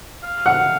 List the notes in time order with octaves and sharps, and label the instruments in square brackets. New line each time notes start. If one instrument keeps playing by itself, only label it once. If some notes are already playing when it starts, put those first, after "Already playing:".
[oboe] F5
[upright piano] F#5